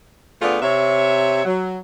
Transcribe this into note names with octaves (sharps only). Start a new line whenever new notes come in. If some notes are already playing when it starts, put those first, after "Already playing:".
D3 A3 B3 F4 G#4 D5
C3 C#5 E5
F#3